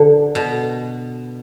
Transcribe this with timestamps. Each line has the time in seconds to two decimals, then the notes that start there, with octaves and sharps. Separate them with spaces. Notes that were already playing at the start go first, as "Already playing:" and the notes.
Already playing: D3
0.35 B2